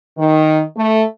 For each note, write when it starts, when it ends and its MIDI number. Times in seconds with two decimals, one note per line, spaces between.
0.18 0.62 51
0.77 1.03 57